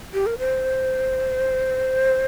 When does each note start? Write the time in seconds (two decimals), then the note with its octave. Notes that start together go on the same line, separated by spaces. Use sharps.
0.14 G4
0.26 A#4
0.38 C5